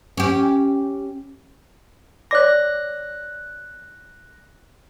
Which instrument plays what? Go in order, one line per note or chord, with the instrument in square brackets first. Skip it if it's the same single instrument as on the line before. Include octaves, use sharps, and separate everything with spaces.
[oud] C#4 G4
[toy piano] C#5 D5 D6 [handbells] F#6 A#6